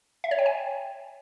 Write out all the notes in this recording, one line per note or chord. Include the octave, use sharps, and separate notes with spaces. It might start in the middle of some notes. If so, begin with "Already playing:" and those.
E5
C#5
G5
G#5